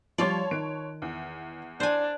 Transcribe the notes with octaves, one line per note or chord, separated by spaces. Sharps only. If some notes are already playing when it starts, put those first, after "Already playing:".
F3 G3 F4 C#5 D5 A5 C6
D#3 F#6 D7
E2
D4 C5 G#5